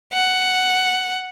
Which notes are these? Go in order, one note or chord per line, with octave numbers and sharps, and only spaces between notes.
F#5